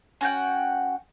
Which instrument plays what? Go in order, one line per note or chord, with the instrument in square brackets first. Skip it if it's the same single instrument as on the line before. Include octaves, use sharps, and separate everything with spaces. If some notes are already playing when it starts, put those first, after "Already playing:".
[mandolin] C#4 F#4 F#5 G5